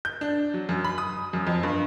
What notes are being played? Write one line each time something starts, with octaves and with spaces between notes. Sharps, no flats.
G6
D4
F#3
F#2
B5
D#6
F#2
F2
G2